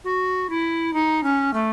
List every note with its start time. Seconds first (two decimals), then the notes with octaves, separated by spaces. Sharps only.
0.04 F#4
0.50 E4
0.93 D#4
1.23 C#4
1.53 A3